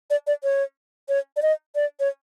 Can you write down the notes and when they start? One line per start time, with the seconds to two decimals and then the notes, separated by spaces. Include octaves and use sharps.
0.10 D5
0.27 D5
0.43 C#5
1.09 C#5
1.36 D5
1.42 D#5
1.75 D5
2.00 C#5